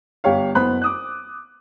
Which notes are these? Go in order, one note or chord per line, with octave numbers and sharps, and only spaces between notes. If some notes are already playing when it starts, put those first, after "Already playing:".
G1 G4 C#5 F5
F#1 B3 C5 B5 F#6
D6 D#6 F#6